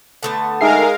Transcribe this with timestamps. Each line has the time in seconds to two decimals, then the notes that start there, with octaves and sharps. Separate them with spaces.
0.23 D3 A3 B3
0.61 G#3 D#4 G#4 A#4 E5 F5 C7